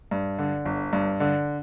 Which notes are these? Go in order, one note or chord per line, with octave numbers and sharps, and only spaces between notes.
G2
D3
G1
G2
D3